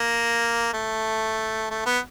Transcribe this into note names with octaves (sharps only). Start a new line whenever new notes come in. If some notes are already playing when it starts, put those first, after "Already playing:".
Already playing: A#3
A3
A3
B3